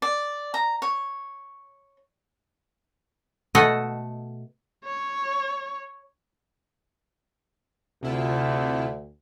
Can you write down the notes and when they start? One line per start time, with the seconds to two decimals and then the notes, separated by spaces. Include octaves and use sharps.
0.02 D5
0.54 A#5
0.82 C#5
3.55 B2 A3 A4 D#5 F#5 G#5
4.85 C#5
8.03 D2 C3 E4 F4